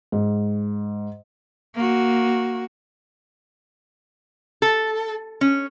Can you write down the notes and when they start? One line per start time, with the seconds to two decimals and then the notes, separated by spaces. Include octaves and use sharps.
0.12 G#2
1.75 A#3 F#4
4.62 A4
5.41 C#4